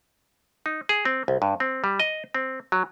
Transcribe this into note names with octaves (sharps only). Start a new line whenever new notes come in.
D#4
G#4
C4
C2
G2
C4
G3
D#5
C4
F#3